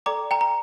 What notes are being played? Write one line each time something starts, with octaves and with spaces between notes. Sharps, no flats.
A4 D5 G5 A#5 D6
G5 A#5
A#5